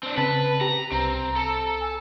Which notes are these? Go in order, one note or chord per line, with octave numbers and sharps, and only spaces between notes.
C4 D4
C#3 C4 B4 A5
G4 A#5
C2 C4 A#5
A4
G#5